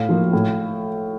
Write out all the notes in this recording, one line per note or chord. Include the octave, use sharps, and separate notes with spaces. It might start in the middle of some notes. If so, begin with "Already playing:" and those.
Already playing: A2 F5
F3 A#3
A2